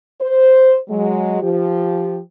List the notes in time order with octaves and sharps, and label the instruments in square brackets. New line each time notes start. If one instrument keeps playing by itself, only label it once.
[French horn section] C5
F#3 G#3
F3 G4